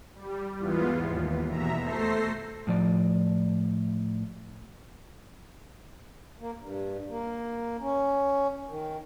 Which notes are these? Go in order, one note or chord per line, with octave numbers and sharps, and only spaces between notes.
G3
E2 G#2 E3 B3 F4
D#2
E2 B2 E5 A#5
A3 A4 C5 A#6 C7
A2 F3 D5
A#3
G2
A#3
C#4
D#3